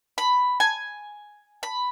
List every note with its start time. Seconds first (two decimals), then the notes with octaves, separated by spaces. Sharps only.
0.18 B5
0.60 G#5
1.63 B5